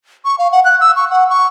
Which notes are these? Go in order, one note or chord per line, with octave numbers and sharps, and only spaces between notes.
C#6
F5
F#5
F#6
E6
C#6
F#5
C#6